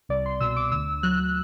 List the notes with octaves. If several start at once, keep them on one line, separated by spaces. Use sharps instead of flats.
C2 D5
C6
B2 E6
D6
D2 E6
F#3 F#6